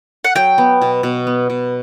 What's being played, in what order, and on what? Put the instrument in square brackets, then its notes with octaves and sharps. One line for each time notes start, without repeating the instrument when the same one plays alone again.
[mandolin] F#5
[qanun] F#3 [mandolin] G5
[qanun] B3
B2
B2
B3
B2